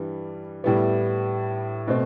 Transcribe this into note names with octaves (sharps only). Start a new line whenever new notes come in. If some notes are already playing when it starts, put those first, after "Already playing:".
Already playing: G2 E3 G3
A2 G3 B3 E4
B2 A3 C4